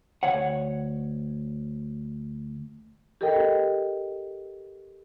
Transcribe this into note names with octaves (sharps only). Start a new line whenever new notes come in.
D2 C#5 F#5
G4 A4 A#4 D#5 G5